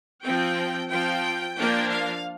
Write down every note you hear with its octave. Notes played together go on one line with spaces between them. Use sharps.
F3 C4 G5
F3 C4 G5
F3 A#3 D4 G5
F5